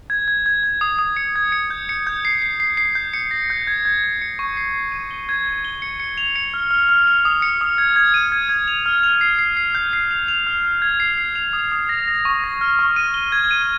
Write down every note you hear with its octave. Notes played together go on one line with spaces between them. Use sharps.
G#6
G#6
G#6
G#6
D#6
D#6
C#7
G#6
C#7
G6
C#7
G6
C7
C7
C7
C7
G6
C#7
A#6
G6
G#6
G#6
G#6
C#7
C#6
C7
C7
D#7
G7
G#6
G#6
G7
C#7
C#7
F7
C#7
F6
F6
F6
F7
D#6
C#7
D#6
G#6
G#6
D#7
G#6
G#6
F7
F6
F7
C7
C7
C7
G6
C7
F7
F7
F6
F6
G#6
C7
C7
F7
D#6
D#6
A#6
A#6
C#6
A#6
F6
C#6
D#7
G7
G#6
D#7